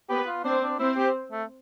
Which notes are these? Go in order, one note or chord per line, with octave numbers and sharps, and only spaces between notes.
B3 G4 B4
F4
C4 D4 C5
D4
C4 E4 C5
G4
A3